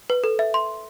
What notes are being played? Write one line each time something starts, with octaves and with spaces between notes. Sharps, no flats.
B4
A4
E5
C6